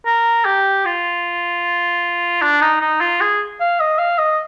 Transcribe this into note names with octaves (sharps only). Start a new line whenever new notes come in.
A#4
G4
F4
D4
D#4
D#4
F4
G#4
F5
D#5
F5
D#5